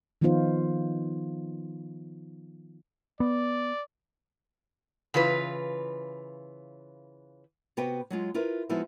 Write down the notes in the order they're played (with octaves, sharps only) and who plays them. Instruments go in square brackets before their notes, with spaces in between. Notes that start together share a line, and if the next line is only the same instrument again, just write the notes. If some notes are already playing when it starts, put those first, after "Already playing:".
[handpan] D#3 F3 B3 D#4 F4 C5
[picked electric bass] B3 [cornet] D5
[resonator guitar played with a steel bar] C#3 E3 F4 B4
[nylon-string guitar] C3 B3 F#4 B4 C5 G5
F#3 G#3 F4
E4 F4 A#4 B4
F3 G#3 B3 D#4 E4 F#4